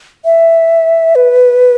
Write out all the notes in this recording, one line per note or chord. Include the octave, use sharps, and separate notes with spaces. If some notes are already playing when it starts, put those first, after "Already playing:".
E5
B4